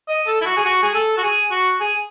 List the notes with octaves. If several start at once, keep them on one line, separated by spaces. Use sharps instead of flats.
D#5
A4
E4
F#4
G#4
F#4
G#4
A4
F#4
G#4
F#4
G#4